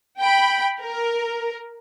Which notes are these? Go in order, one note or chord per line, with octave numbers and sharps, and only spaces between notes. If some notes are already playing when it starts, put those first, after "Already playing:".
G5 B5
A#4